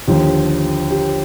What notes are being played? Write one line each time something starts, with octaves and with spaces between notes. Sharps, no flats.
D#2 D3 F3 G4
G4